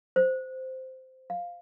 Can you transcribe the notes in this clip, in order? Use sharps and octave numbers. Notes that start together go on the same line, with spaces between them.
C5
F5